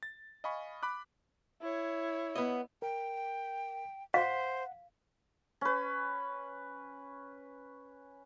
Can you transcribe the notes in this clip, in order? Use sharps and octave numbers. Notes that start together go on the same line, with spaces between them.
A6
D#5 F5 G#5 B5 C#6
B5 D6 F#6
E4 C#5
B3 D#5
A#4 G5
C5 F5 F#5
C#4 B4